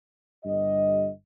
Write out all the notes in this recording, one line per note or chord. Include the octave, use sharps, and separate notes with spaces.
G1 G2 G4 D#5